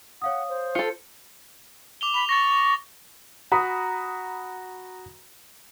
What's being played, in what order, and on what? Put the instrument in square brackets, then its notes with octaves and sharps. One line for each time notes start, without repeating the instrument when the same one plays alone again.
[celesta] C#5 F5 D#6 [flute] F#5
[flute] C5
[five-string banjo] F4 A4 [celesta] C#7
[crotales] D6 F7 G7
[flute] B5 [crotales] F7
[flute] C#6 [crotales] A6 A#6
[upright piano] F#4 A#5 B5 D#6